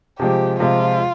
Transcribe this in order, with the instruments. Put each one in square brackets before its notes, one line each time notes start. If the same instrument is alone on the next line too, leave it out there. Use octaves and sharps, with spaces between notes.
[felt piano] C3 F3 G#3 [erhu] G4
[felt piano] C3 F3 G#3 [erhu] F4